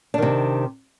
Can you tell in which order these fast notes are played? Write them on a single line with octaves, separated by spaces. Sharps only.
D4 D#3 C3